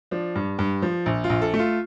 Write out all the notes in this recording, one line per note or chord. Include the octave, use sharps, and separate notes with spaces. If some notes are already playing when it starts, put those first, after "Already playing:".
F3 D4
G2
G2
F3
A#1
F4
A#1
A4
A3
F4